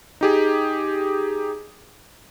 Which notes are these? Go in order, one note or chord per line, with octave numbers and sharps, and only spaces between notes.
D#4 G4 G#4